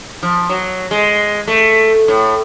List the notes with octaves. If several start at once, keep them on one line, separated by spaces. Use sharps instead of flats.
F3
F#3
G#3
A3
A2